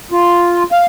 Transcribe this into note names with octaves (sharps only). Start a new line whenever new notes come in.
F4
F5